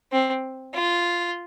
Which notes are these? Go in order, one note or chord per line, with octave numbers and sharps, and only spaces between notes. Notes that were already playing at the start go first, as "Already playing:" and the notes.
C4
F4